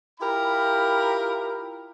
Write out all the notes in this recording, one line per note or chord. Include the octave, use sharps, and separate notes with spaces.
E4 F4 G4 A#4 A#5 B5